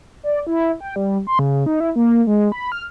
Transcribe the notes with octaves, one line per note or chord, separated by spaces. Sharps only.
D5
E4
G5
G3
C6
C#3
D#4
E4
A#3
G#3
B5
F6